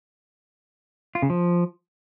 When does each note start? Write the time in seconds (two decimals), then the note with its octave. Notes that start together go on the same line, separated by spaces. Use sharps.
1.15 F4
1.22 C#3
1.30 F3